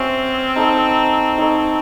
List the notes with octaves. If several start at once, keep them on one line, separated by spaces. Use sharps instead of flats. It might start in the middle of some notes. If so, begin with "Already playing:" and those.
Already playing: C4 C#4 F#4 C5 E5
D#4 A4 C#5
D#4 A4 C#5